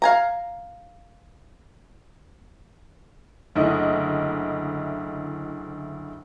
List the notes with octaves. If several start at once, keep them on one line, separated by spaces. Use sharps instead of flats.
F5 G#5 A#5
F#1 D2 E4 D#5